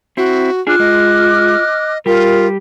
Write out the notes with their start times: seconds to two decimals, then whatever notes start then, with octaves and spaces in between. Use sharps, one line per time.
0.17 C4 E4 F#4
0.67 D4 F4 G#4 D6 F6 F#6
0.79 G#3 D#5
2.06 G3 F4 G4 A#4